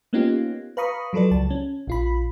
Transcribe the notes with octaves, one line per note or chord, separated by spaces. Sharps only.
A#3 B3 C#4 D#4 F4 G4
B4 F5 A#5 B5 C#6 D#6
F3 F#3 A4 B4 D5
C#2 A5
C#4
A#1 F4 B5